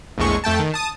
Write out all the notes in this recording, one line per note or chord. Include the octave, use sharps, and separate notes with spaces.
A#1 E2 A2 G#3 C#6
F2 A3 G5 A5
D#3
A5 D#6